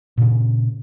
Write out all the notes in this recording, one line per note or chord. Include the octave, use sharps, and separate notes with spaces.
A#2 C#3